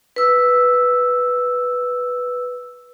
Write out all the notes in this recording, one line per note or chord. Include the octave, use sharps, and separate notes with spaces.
B4 E6